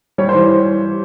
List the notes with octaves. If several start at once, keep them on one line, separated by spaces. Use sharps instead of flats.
G3 C#5
C5
E3